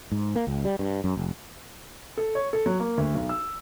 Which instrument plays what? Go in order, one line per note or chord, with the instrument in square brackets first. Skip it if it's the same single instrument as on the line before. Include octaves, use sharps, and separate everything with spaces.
[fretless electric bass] G#2
A#3
C#2
G3
G2
F#2
F1
[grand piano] A4
C#5
A4
F#3
A#3
D2
B1
E6